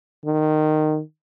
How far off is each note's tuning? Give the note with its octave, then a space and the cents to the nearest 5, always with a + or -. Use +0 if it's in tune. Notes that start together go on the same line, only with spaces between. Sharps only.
D#3 -15